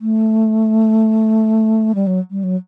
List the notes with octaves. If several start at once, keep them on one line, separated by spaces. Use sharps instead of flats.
A3
G3
F#3
G3
F#3